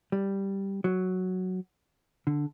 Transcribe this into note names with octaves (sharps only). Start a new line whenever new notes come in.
G3
F#3
D3